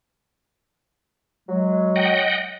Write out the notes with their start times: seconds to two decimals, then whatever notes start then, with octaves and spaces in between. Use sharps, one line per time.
1.49 F#3 G#3
1.96 D#5 F#5 G5